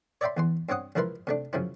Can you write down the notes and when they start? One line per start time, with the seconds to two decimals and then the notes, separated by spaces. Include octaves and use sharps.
0.21 C#5 D5 E5 G5 B5 C6
0.37 E2 E3 C6
0.69 G2 C4 C#5 F#5 D#6
0.95 C#2 F3 E4 A#4 B4 C6
1.27 C3 A3 D4
1.53 F#2 C#3 F3 E4